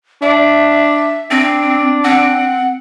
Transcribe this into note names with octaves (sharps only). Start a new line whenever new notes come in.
D4 E5
C4 D4
C4 F#5